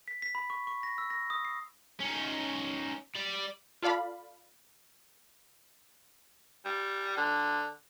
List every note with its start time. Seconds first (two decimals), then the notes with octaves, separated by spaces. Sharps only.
0.08 B6
0.22 B6
0.35 B5
0.50 C#6
0.67 C#6
0.83 A#6
0.98 E6
1.10 A#6
1.30 D#6
1.45 C7
2.00 C#4 D#4
3.16 G3 D5
3.83 F4 A4 D5 F5 B5
6.66 G3
7.17 D3